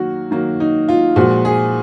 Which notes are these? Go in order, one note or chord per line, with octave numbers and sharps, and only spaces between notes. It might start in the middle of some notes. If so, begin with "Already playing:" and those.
Already playing: D#3 F#3 A#3 F#4
D#3 F#3 A#3
D#4
F4
A#2 F3 G#3 F#4
G#4